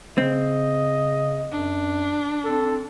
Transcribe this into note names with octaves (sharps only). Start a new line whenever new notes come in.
C#3 C4 D#5
F#2 D4
C4 A4